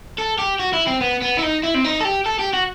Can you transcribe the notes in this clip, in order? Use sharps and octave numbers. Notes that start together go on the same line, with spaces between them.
A4
G4
F#4
E4
C4
B3
B3
E4
D#4
E4
C4
D#4
A4
G4
A4
G4
F#4